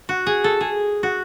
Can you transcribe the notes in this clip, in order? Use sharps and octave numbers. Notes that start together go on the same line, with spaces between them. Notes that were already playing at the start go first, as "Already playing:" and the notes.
F#4
G#4
A4
G#4
F#4